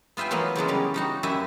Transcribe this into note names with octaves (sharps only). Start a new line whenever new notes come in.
B3 F4 E5 G5 G#5
E3 F#3 A#3 B3
E2 C#3 F#3 G#3
C#3 G3 A#3
G3 D#4 F#4
F#2 E4 G4 E5 F#5 G#5